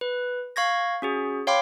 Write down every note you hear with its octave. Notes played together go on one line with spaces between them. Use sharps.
B4
F5 C#6 G#6 A#6
C#4 F#4 G#4
C#5 F5 G5 B5 C6 D6